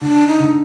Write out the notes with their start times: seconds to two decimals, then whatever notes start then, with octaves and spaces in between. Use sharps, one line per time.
0.01 D3 D4
0.27 D#4
0.40 D3